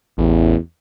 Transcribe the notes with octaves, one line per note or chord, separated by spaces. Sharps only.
A1 E2